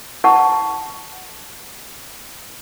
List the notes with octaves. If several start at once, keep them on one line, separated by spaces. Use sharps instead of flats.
E4 B4 F#5 A5 C#6